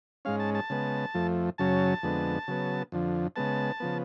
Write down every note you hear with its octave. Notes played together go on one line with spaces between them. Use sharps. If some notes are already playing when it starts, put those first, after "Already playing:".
G#2 G#3 C#4 F5
A5
A5
C#3 G#3 B3
F2 F3 A3
F#2 C#3 F#3 C#4 A5
F2 D3 G#3 B3
C#3 F#3 B3
F2 D3 F3
C#3 G#3 B3 A5
C#3 F3 B3